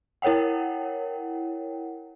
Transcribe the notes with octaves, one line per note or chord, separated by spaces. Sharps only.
E4 A#4 C#5 F#5 G5